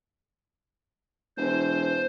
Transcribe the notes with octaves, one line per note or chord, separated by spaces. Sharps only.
E1 C5